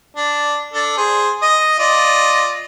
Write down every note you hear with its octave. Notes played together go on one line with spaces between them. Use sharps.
D4
D4 A4
G#4 C5
D#5 D#6
F4 D5 D#5